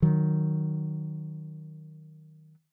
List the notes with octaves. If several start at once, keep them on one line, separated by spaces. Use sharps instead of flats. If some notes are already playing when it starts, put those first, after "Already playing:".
D#3 F#3